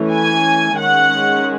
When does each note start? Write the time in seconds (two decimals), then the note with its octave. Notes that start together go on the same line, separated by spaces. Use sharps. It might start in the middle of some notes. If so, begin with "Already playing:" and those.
Already playing: E3 A3 C#4
0.10 G#5
0.77 D#3 G#3 C#4 F#5